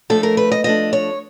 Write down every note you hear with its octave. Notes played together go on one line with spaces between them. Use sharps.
F3 A3 D4 A4
A#4
B4
D#5
F3 A3 D4 D#5
C#5